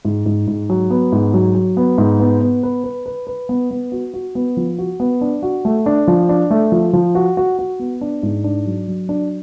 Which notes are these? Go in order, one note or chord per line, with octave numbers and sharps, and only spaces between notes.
G#2
G#2
G#2
F#3
B3
G#2
F#3
F#3
B3
G#2
B3
B3
B4
B4
B4
B4
B3
B3
F#4
F#4
B3
F3
F#4
B3
D4
F#4
A3
D4
F3
D4
A3
F3
F3
F#4
F#4
F#4
B3
D4
G#2
D4
F#3
F#3
D4